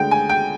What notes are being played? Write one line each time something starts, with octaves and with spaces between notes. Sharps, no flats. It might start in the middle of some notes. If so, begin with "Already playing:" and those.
Already playing: D2 D3 G#3 G5
G#5
G5